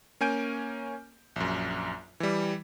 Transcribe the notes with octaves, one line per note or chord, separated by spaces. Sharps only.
A#3 C#4 G#5 G6 D7
A#1 F#2
E3 G3